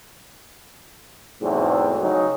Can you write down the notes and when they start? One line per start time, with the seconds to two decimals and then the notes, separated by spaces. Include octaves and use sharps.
1.42 E2 G#2 B2 F#3 A3 C4
2.02 C#3 F#3 C#4 D#4